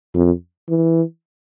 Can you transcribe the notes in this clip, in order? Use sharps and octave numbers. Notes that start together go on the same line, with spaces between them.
F2
E3